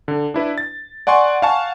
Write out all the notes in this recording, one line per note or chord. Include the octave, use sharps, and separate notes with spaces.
D3
D4 E4 B4
A6
D5 F#5 G#5 C6 C#6
F5 F#5 G#5 A5 C#6